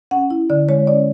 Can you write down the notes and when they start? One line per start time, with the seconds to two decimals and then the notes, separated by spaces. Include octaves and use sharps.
0.11 C#4 F#5
0.30 E4
0.50 D3 D5
0.69 G#3 C#5
0.87 C#4 D5